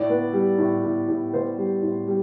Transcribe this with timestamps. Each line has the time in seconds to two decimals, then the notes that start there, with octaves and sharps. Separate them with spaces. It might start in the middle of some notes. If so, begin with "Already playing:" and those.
Already playing: A2 D5
0.09 B3
0.33 G3
0.58 A2
0.83 A2
1.08 A2
1.33 B3 C5
1.58 G3
1.82 A2
2.08 G3